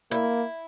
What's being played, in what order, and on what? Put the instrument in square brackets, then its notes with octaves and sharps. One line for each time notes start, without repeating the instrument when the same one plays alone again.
[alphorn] A#3 [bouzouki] E4